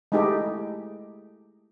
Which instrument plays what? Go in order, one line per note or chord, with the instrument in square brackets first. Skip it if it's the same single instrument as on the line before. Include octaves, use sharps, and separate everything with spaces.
[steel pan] G#3 A3 D#4 E4 G4 A4